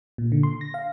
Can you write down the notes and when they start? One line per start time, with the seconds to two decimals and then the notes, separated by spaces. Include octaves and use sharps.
0.18 A#2
0.32 D3
0.43 C6
0.61 A#6
0.74 F5